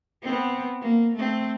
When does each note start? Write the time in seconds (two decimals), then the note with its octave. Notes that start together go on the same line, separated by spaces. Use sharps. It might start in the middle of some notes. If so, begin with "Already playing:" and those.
0.22 B3 C4
0.82 A#3
1.16 A3 C4